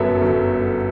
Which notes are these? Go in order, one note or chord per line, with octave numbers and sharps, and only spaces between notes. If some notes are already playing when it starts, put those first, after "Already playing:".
Already playing: G1 F#2 F#3 B3 A4 E5
G1